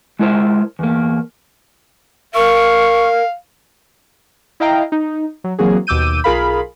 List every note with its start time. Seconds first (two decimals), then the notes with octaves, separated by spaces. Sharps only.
0.19 G#3 E4 A#4 C5
0.79 E2 A#3
2.35 A#4 F5 C#6
4.60 E4 D#5 F5 G5 A#5
4.92 D#4
5.44 F#3
5.59 E3 F#3 A#3 C4 F#4 G#4
5.87 D#2 B2 D6 E6 G6 D#7
6.24 B1 F4 G#4 A#4 F5 B5